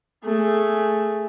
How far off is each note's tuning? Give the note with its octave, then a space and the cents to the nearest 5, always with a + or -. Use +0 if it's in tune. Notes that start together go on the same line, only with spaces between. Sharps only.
A3 +0 G#4 +0